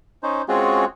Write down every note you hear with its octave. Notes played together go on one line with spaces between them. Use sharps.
C#4 D#4 C5
G#3 C4 C#4 F4 F#4 G#4